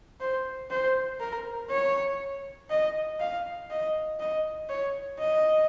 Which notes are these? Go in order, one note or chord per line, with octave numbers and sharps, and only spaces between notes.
C5
C5
A#4
C#5
D#5
F5
D#5
D#5
C#5
D#5